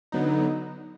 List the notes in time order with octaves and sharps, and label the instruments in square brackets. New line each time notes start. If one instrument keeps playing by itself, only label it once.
[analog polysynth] D3 F#3 B3 D#4